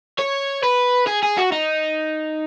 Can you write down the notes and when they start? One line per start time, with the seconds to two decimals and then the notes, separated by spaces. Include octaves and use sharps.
0.19 C#5
0.63 B4
1.07 G#4
1.23 G#4
1.38 F#4
1.52 D#4